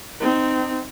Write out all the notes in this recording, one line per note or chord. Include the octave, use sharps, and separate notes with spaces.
C4 D#4